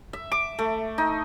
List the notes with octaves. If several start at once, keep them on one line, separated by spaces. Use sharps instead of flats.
E5
D6
A3
D#4